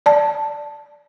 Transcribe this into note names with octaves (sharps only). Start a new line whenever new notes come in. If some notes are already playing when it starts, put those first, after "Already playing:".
D5 A5